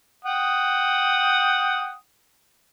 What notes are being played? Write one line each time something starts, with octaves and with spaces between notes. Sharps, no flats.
F#5 G5 D#6